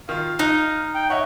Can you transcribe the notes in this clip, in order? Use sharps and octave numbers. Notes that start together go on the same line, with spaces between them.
D#3 F4 F5
D#4 F#6
G5
C#5 D#5 E5 F#5